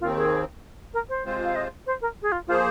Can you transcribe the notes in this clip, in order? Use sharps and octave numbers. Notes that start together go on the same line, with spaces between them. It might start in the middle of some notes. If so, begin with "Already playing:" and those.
D#2 D#3 C4 F4
G#4
A#4
C5
C3 G#3 C4 F4 C5
F5
D#5
C5
A#4
G#4
F4
F3 A#3 F4 G#4 C5